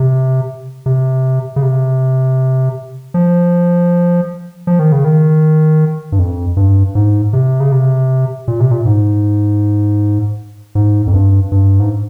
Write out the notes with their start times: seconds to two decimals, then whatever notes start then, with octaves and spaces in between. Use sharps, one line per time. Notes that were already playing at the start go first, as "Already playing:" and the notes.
Already playing: C3
0.86 C3
1.56 C#3
1.62 C3
3.14 F3
4.67 F3
4.79 D#3
4.92 C#3
5.05 D#3
6.12 G2
6.19 F2
6.57 G2
6.95 G#2
7.33 C3
7.60 C#3
7.72 C3
8.48 A#2
8.60 C3
8.71 A#2
8.85 G#2
10.75 G#2
11.07 F2
11.13 G2
11.52 G2
11.80 G#2